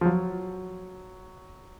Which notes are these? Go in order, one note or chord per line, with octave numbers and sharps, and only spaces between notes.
F3
F#3